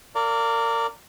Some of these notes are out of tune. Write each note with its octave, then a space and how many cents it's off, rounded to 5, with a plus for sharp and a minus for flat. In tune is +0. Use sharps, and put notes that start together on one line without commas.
A#4 -30 D5 -15 F5 +0